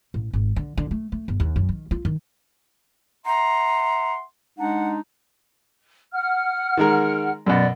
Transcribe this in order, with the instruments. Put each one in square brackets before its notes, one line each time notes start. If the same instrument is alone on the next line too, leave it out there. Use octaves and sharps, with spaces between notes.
[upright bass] A1
G#1
D3
D3
A3
A3
G1
D#2
F#2
D#3
F4
D#3
[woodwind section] E5 F#5 C6 [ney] A#5
[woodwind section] G#3 D4 D#4 [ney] F#5
[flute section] F#5 F6
[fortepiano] D#3 G#3 A#4
[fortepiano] F#2 B2 [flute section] D5